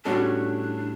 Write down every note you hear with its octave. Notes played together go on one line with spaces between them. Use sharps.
A2 G3 C#4 D4 F#4 A4